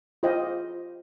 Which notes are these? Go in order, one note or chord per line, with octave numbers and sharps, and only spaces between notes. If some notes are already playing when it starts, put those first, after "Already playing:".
F4 G4 C5 D#5 G5